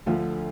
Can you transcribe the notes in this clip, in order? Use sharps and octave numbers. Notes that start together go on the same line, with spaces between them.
D2 D3 F3 F4